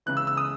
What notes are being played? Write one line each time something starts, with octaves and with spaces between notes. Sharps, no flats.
C#2 C#3 E3 F#6
E6
E6
D#6